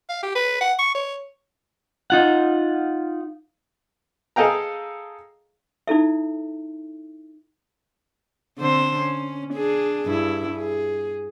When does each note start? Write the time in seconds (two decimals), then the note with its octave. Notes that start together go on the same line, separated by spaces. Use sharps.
0.09 F5
0.23 G4
0.35 B4
0.61 F#5
0.79 C#6
0.95 C#5
2.10 D#4 F4 F#5
4.36 G#4 A4 D#5 F5 G5 A#5
5.87 D#4 E4 A4 E5
8.58 D3 C4 C5
8.99 C#4
9.54 D4 G#4
10.06 G2 E4
10.57 G#4